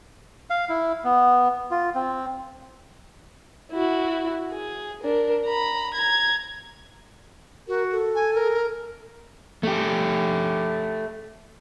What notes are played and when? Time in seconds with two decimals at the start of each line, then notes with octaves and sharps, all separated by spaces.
0.50 F5
0.69 E4
1.04 B3
1.71 F4
1.95 C4
3.72 E4 F#4
4.51 G#4
5.03 D4 A#4
5.45 A#5 B5
5.94 A#5 G#6
7.68 F#4 A#4
7.92 A4
8.15 G#5
8.35 A#4
9.63 A3 G4